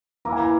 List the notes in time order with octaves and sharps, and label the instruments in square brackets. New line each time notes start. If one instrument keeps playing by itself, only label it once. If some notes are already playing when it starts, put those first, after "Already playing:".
[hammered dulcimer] E3 A#3 E4 [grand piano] A#5
[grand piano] G#5
A#5